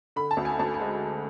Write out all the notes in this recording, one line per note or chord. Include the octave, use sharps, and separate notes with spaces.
D3 B5
A5
D2
G#5
D2 A5
G#5
G#3